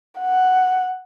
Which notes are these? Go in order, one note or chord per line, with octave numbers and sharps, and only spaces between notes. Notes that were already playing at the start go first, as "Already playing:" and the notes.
F#5